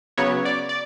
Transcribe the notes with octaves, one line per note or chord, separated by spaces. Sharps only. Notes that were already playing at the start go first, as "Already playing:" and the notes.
C#3 F#3 B3 C#5
D5
D5